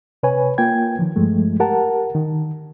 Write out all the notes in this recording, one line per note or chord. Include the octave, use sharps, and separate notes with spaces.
C3 B4 C#5 G#5
A#3 F4 G5 G#6
D#3 F3
G2 F3 G#3 A3
G4 A#4 F#5 A5
D#3